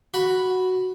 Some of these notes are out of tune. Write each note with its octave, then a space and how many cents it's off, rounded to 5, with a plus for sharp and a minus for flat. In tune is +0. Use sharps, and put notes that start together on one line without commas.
F#4 +0 B5 +0